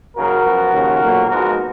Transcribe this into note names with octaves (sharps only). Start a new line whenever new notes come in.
D#2 C#3 F#3 F#4 A#4
F#2 F3 B3
D#2 C#3 F3
B1 A#2 F#3 A#3
G#2 F3 G#3 B3 F#4 A#4